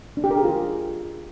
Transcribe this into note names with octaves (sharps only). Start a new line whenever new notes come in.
D4
G4
A#4
G#4
F4